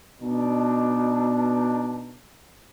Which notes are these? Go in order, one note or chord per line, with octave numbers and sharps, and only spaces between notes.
B2 D4 D#4